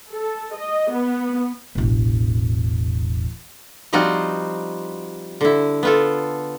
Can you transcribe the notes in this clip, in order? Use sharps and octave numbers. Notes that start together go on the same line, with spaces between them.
A4
D#5
B3
E1 A1
F3 G3 C4 D#4 F4 F#4
D3 E4
B3 F4 A4